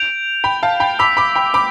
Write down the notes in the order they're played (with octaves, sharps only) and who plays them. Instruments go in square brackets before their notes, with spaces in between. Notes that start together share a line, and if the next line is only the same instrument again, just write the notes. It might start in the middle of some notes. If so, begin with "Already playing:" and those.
Already playing: [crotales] G6 D7 F7
[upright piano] G5 B5
F5 A5
G5 B5
[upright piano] B5 D6 [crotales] E6 B6 F7
[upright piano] B5 D6
G5 B5
B5 D6